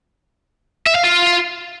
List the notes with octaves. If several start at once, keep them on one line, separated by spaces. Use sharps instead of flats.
E5
F5
F4